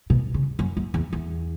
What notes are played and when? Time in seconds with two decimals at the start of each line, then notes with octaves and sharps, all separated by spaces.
0.10 B2
0.34 C#3
0.59 F#2
0.77 F#2
0.94 E2
1.13 E2